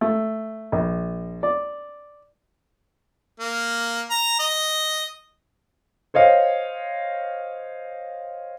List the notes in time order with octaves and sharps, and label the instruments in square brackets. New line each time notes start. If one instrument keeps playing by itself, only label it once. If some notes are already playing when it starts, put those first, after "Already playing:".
[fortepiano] A3
A#1
D5
[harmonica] A#3
A#5
D#5
[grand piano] C5 C#5 D#5 F5